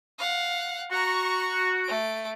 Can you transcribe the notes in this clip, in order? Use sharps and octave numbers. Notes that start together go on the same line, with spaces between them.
F5 F#5
F#4 A#5 C#6
A3 D7